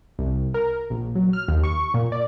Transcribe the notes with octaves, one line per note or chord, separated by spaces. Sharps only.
C2
A#4
A#1
F#3
F6
D#2
C#6
A#2
D5